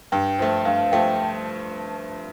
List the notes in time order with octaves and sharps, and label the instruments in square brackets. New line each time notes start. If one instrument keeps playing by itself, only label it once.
[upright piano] G2 [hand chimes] G5
[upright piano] F3 A3
[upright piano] G2 [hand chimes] F5
[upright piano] F3 A3 [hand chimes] G5